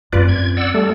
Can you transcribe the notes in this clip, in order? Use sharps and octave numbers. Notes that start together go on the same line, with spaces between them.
F#2 C4 F4 B4 D5
G#6
D5 F#5 E6
G3 A3 A4